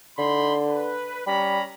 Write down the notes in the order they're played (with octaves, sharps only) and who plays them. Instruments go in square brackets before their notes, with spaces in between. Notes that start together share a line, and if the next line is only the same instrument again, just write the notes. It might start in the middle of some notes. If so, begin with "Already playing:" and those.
[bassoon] D3 [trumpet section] D#4 B5 C6
[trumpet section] B4
[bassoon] G3 [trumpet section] C#4 A#5 B5